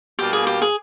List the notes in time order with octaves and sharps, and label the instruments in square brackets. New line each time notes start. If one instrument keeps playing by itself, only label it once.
[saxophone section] B2 G3 A#3 D4 [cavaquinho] G4
[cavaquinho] G#4
G4
G#4